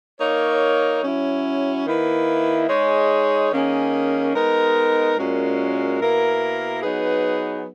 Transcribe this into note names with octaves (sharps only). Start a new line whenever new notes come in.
A#3 D#4 A#4 C#5
F#3 C#4 E4
D#3 A#3 E4 B4
G#3 D#4 G#4 C#5
D#3 A#3 C#4 G#4
G#3 B3 D#4 A#4
A#2 G#3 C#4 F#4 A#4
B2 A#3 E4 A#4
F#3 B3 D#4 G#4 B4